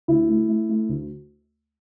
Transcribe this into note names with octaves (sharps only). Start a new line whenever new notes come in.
D2 E4
A3
A3
A3
D2